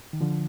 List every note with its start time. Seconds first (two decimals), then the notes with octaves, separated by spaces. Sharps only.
0.13 D#3
0.21 D3 F3